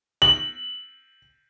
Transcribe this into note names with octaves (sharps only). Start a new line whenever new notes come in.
F#7